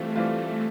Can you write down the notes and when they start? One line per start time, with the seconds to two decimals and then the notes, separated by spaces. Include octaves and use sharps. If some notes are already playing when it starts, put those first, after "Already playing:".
Already playing: E3 G3 A3 C4 F4
0.16 E3 G3 C4 F4